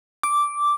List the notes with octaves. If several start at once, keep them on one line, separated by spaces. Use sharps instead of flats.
D6